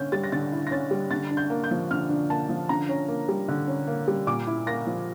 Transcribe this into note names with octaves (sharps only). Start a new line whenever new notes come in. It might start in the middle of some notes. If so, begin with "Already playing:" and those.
Already playing: D3 C#4 G6
G3 A6
A#6
D3 A6
E4
A#6
C#4 A6
G3
D3 A6
D4
G6
A#3
G6
F3
D3 F6
D4
A#3 A5
F3
D3 A#5
C#4
A#3
G3
D3
C#4
A#3
G3
A#2 D6
E4
A#3 A#6
F3